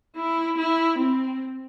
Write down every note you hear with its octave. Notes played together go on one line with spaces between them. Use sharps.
E4
E4
C4